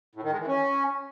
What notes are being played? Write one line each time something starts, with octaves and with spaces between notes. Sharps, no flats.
A2
D#3
G#3
E3
C#4